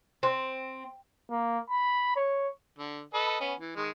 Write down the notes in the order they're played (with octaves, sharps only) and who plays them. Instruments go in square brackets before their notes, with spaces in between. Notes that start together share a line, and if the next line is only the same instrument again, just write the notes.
[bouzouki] C4
[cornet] A#3
B5
C#5
[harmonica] D3
A4 B4 D#5
B3 C#4
E3
D#3 G#3